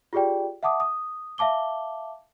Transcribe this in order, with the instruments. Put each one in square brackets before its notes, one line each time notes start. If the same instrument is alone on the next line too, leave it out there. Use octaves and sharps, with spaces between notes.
[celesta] F4 G4 G#4 D5 G5
E5 F#5 A5 D6 D#6
D#6
E5 F5 A5 D6 G7